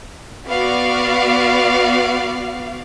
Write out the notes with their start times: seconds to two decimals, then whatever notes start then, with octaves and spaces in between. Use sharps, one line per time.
0.48 B3 F#4 D5 F5